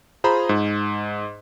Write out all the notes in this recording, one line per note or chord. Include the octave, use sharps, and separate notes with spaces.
F4 G#4 C5 A#5 B5
G#2